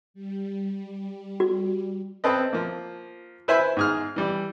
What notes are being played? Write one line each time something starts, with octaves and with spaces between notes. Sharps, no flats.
G3
F#4
C4 A4 B4 D#5
F3 A#3
E4 B4 C5 E5 G#5 B5
G#2 G#4 F6
E3 G3